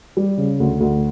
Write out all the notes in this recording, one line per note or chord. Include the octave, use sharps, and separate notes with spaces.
G3
C#3
D2
D2